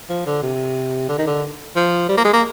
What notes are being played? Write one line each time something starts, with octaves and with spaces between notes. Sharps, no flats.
F3
D3
C3
D3
D#3
D3
F3
G3
A#3
G#3
A#3